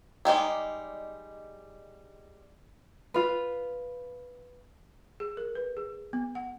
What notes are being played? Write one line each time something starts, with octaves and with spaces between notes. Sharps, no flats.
G3 G#3 D#4 D5
F4 B4
G#4
A#4
B4
G#4
B3
F#5